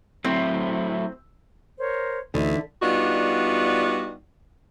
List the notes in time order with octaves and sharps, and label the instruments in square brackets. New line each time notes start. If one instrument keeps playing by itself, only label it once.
[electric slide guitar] F#3 A3 E4 [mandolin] C4
[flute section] A#4 C5 C#5
[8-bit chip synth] D2 [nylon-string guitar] D3 [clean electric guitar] E3 D#4 [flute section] E5
[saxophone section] G3 B3 D4 D#4 F4 F#4